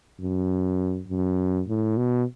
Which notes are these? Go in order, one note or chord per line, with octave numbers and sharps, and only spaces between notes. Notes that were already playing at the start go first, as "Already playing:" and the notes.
F#2
F#2
A2
B2